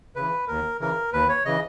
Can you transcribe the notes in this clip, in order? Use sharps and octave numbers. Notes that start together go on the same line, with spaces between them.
C#3 E3 B4
D#2 A#4
C#3 E3 A#4
D#2 B4
C#5
C#3 E3 D#5